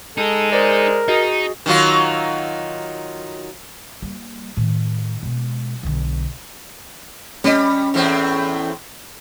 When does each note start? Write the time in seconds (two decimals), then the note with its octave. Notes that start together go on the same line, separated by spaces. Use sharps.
0.18 G#3 D#4 A4
0.52 G#4 A#4 C5 D5
1.08 D#4 F#4 G#4 D#5
1.66 D#3 F#3 F4
4.02 G3 A#3
4.57 A2 D#3
5.23 B2 G#3
5.83 B1 D3
7.44 G3 C#4 D#5
7.94 E2 A2 C4